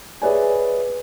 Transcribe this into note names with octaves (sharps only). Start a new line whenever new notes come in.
G#4 B4 C#5 D5 E5 G#5